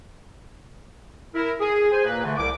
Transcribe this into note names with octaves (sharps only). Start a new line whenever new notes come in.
E4 A#4
G#4
C5 G#5
A#2 A#3 B4
D3 E3 A3
C2 D6